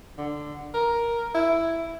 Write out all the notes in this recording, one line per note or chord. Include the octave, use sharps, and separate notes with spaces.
D3
A#4
E4